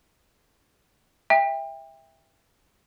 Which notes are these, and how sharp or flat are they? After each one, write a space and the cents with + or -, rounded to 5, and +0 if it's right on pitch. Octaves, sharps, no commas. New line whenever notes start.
E5 -10 G5 +30